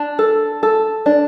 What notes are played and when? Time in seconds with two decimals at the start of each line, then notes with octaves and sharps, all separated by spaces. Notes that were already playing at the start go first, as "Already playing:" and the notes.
Already playing: D4
0.19 A4
0.63 A4
1.06 D4